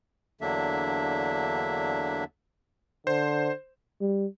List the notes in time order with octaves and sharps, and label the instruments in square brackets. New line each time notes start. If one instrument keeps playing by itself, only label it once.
[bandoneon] E2 D3 F#3 A#3 D4 E5
[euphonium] D3 [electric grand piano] C5
[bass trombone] G3